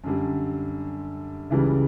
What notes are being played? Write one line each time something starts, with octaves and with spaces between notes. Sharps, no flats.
F#2 D3 G3
C#2 C#3 E3 G3